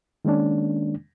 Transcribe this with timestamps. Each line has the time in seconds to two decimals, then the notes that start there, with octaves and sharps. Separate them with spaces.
0.25 D#3 G#3 A#3 C#4 D4